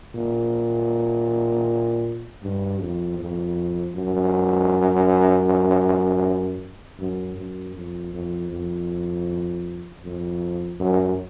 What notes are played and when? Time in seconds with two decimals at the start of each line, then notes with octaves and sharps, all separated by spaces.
0.15 A#2
2.43 G2
2.81 F2
3.19 F2
3.95 F#2
7.00 F#2
7.37 F#2
7.76 F2
8.14 F2
8.51 F2
10.03 F2
10.80 F#2